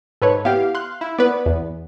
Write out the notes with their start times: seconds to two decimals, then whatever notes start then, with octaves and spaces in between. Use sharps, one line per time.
0.22 G#2 A4 B4 C#5
0.45 B3 E4 G4 F5
0.75 C6 F#6
1.01 E4
1.18 B3 B4 D5
1.46 E2